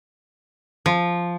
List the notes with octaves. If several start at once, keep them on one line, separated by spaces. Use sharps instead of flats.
F3